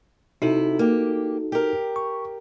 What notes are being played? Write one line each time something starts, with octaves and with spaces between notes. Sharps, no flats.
C3 D#4 E4 F#4 A4
A#3 G4
G4 A#4
C#6